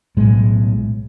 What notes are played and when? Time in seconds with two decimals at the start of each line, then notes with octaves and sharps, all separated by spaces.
0.17 B1 A2 G#3